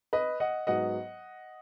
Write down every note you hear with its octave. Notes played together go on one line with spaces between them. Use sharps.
B4 D#5
D#5 F#5
G#2 F#3 B3 D#5 F#5